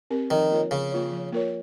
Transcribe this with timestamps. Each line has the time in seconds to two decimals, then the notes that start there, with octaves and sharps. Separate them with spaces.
0.10 C4 G4 A#4
0.31 D#3 F3
0.51 A#3 F4 A#4 C#5
0.71 C#3 F3
0.92 A#3 F4 A#4 C#5
1.12 F3
1.32 A#3 F4 A#4 C#5